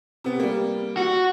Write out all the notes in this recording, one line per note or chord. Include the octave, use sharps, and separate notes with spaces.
C3 B3
G3 A#3
F#4